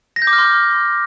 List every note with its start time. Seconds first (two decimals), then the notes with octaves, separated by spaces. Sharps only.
0.16 A#6
0.22 G6
0.27 D6
0.33 F6
0.38 C6